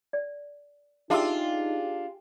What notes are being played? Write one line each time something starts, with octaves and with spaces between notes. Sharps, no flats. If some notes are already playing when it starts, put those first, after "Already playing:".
D5
D4 D#4 F4 G4 G#4 E5 C6 E6